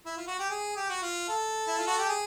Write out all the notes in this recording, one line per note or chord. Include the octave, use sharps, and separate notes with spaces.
E4
F4
F#4
G4
G#4
G4
F#4
F4
A4
E4
F4
F#4
G4
G#4